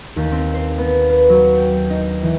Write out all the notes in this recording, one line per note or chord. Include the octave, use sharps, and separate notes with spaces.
D#2
C4
C5
B3
B4
F#3
G5
D#4
E3